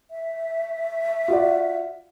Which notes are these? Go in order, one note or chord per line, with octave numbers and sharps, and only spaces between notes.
E5
F4 F#4 D5